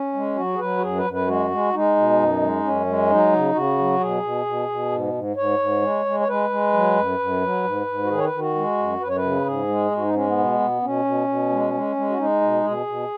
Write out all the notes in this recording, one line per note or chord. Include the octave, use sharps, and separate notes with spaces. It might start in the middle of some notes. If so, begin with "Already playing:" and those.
Already playing: C#4
G#3
F#3 F#4
G#4
F#3 B4
F#4
F#2 G#4
B4
F#2
B4
G#3 F#4
G#3
G#3 D#4
B2
F#2
G#3
F#2 C#4
G#3
F#3 D#4
C#3
C#3 F#4
F#3
B2 G#4
B2
B2
B2
G#2
G#2
G#2 C#5
G#2
G#3
G#3
C#5
G#3 B4
G#3
F#3
F#2
F#2
F#3
G#2
G#2
F#4
D#3 G#4
C#5
B4
D#3
F#4
G#3
F#2
F#2 B4
C#5
B4
C#3
G#2 G#4
G#3
G#2
F#4
D#4
G#3 C#4
B3
B2
B2
B2 C#4
B2
B2
G#3
G#3
G#3
F#4
G#3 D#4
B2
B2 G#4
B2